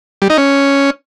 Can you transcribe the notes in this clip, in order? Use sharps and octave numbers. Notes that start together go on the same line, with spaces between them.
G3
D#4
C#4